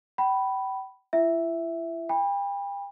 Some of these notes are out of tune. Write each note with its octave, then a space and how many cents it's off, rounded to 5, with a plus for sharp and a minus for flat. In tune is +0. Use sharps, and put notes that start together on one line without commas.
G5 -35 B5 +0
E4 +35 E5 +0 G5 -25
G5 +40 B5 -15